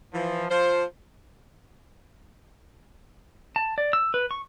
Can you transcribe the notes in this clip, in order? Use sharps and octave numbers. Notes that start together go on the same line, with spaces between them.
E3 F3
F3 C5
A5
D5
E6
B4
C#6